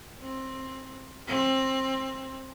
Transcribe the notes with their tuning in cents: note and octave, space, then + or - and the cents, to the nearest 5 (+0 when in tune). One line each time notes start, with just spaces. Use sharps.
C4 +15
C4 +20